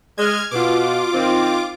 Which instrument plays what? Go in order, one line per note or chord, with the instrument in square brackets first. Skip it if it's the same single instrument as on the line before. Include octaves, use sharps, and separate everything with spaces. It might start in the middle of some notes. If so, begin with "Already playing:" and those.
[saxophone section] G#3 D#5 [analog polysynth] F6 G#6
[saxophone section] B2 [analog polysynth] F4 D6
[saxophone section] D#3 C4